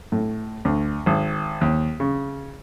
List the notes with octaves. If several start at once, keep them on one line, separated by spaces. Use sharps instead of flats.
A2
D2
G#1
D#2
C#3